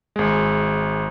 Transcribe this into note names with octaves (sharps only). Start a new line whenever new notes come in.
G#1 G#3